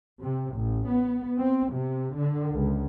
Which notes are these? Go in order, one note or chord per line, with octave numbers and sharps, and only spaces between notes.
C3
A1
B3
C4
C3
D3
C#2